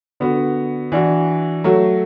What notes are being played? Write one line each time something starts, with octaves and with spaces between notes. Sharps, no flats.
D3 B3 F#4
E3 D4 F#4
F#3 A3 F#4